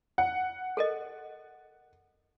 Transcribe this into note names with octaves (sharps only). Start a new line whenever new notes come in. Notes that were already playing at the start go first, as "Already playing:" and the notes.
F#5
A4 A#4 D#5